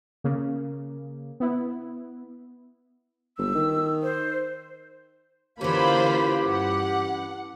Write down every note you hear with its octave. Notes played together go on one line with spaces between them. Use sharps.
C#3 A#3
B3 E4
G1 E6
D#3
C5
D3 E3 A#3 C#4 F4 G4 C5 B5
G2 F#5